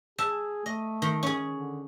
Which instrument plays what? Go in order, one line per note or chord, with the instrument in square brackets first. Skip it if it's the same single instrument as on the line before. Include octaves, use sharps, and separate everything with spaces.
[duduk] G#4 [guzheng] E5 A5
[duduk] A3 [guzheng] D#5
[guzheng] D#3
C#4 G#4
[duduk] D3